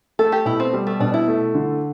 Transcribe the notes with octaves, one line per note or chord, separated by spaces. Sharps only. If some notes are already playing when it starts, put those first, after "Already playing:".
A3 A4
G4
B2 E4
C4
G3
A3
B2 D4
E4
A3
D3